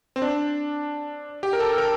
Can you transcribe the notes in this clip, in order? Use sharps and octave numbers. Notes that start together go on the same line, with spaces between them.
C4
D4
G4
A#4
A4
A#4